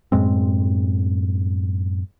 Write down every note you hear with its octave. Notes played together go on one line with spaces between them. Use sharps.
F#2 A2 G#3 C4